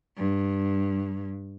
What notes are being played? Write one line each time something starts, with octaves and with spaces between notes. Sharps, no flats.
G2